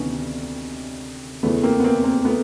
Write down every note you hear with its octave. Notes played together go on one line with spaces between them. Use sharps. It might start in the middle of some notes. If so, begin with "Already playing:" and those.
Already playing: D2 C3 D#3 B3 C#4
E2 C#3 E3 A3 B3
A#3 C4
B3
A#3 C4
A#3 C4
A3 B3